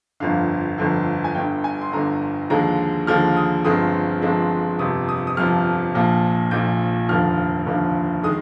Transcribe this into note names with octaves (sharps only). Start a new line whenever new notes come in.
G1 F2 D3 F5
G1 F2 D3
G#5
G1 G2 D3 G5
G#5
C6
G1 G2 D3 A#5
D#2 D3 F3 G#3 A#5
D#2 D3 F3 G#3 F6
D#6
G1 G2 F3 G#3 C4 D#6
G1 G2 F3 G#3 C4
G1 F2 C3 F3 D#6
D#6
D#6
G1 F2 C3 F3 F6
A#1 A#2 F3
A#1 A#2 F3 G6
F1 D#2 D3 F3 F6
F1 D#2 D3 F3
D#3 G#3 D#6